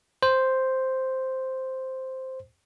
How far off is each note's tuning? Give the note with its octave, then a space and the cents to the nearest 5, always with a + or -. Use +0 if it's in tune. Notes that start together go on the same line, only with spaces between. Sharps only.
C5 +0